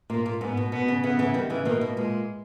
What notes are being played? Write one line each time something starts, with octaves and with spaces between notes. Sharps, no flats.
A#2 A#3
A#2
G#2 B3
B2
B2 B3
C#3
C#3 E3 B3
C#3 E3
D#3 G3
C#3 E3
B2 D#3 A#3
B2
A#2 G#3